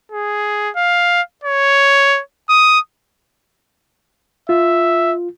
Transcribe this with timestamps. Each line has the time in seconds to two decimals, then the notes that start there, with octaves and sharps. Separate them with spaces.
0.12 G#4
0.76 F5
1.44 C#5
2.49 D#6
4.49 F4 E5